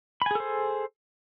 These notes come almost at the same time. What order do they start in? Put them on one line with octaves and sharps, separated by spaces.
B5 G#5 G#4 A4 C5